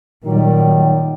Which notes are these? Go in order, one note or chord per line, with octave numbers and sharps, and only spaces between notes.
A#2 D#3 F#3 G3